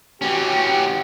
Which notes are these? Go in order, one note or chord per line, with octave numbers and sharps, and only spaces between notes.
E3 C#4 F#4 G4